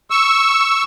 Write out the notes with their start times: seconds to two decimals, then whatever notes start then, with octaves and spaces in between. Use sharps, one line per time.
0.10 C#6 E6